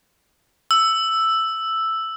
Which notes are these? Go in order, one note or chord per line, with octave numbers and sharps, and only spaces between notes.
E6